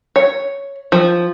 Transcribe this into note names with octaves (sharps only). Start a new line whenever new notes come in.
C#5
F3